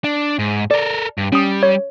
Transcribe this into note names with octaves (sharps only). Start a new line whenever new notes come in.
D4
G#2
A4 A#4 D5
G2
G3 C#4 D#6
C#5